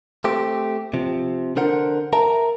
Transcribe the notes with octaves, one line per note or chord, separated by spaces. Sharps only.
A3 C4 G4
C3 F3
D3 D4 A#4 C5 F#5
A#4 E5 A5 A#5